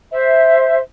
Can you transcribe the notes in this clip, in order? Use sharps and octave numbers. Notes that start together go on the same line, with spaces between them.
C5 E5